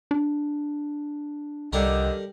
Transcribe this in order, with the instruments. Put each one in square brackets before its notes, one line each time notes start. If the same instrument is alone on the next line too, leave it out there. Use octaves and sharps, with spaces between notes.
[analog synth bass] D4
[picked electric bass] C2 [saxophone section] F2 D3 D#3 [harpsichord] G3 A4 A#4